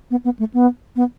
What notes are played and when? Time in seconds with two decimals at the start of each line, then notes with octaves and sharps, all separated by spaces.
0.11 B3
0.25 B3
0.39 A3
0.54 B3
0.96 B3